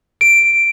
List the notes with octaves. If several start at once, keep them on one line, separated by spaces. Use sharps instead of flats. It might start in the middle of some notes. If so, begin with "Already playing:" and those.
D7